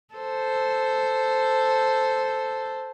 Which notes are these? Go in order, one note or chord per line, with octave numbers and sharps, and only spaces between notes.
A4 C5